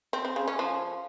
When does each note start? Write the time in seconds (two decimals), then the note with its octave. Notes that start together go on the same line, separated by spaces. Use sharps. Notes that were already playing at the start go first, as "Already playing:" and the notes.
0.13 C4
0.25 C4
0.36 C#3
0.48 C#4
0.59 F3